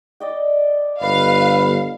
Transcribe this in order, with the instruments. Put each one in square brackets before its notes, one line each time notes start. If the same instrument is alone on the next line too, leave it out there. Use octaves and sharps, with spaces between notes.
[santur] D5 D#5 G5
[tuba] G1 [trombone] B4 [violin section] F5